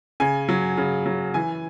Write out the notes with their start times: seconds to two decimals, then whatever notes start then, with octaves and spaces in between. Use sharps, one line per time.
0.20 C#3 G#5
0.49 F#3
0.77 C#3
1.06 F#3
1.34 E3 G#5